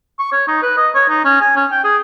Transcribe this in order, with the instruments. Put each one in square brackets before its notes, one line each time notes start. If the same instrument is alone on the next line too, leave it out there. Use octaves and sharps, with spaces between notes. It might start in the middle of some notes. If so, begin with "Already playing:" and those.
[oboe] C#6
C#5
D#4
B4
D#5
C#5
D#4
C#4
G#5
C#4
G5
G#4